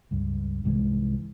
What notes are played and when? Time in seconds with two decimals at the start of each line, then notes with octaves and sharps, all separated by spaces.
0.11 C#2 G2
0.64 C2 G#2 E3 G#3